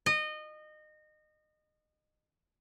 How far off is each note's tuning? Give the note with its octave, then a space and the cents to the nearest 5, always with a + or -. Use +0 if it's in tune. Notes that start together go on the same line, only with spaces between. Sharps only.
D#5 -25